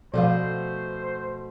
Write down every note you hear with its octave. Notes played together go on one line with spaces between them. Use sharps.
B2 F3 A3 A4 C5 F5